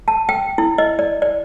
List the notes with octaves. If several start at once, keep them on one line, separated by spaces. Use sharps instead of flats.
A5
G5
E4
D#5
D5
D5